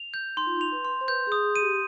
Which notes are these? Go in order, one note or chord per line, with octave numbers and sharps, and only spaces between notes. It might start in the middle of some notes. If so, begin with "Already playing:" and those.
Already playing: F7
G6
D#4 C6
F4
D#4
F7
B4
C6
C5
B4 G6
G#4
D#6
G#4
D#7
G4